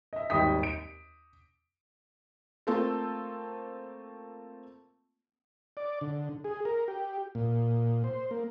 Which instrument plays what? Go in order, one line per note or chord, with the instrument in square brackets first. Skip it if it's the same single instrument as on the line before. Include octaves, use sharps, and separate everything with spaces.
[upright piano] D#5 E5
G#1 D#2 G3 G5 D#6 B6
D7
[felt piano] A3 A#3 C4 F4 A4 E6
[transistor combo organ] D5
D3
G#4
A#4
G4
A#2
C5
A#3